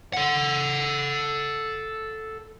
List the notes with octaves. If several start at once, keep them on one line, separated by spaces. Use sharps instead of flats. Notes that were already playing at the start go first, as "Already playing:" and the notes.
A4 F#5